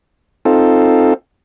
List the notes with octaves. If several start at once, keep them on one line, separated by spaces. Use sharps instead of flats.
C4 D#4 F4 A4